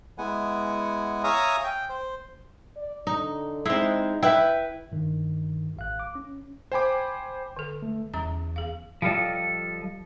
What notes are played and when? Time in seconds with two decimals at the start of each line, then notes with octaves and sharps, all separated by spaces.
0.18 G#3 B3 E4 F#5 G#5
1.24 C#5 E5 F5 G#5 A#5 D#6
1.64 G5
1.89 C5
2.76 D5
3.07 D3 D#4
3.66 G#3 C4 D#4 E4
4.23 E4 B4 E5 G5
4.92 G2 D#3
5.76 A1 F5 F#6
6.00 D6
6.15 C#4
6.72 C5 G5 G#5 B5 D6
7.57 D3 A4
7.82 A3
8.14 E2 G3 C#4 A#5
8.56 G#4 F5
9.02 F3 G3 F4 A4 D5 D#5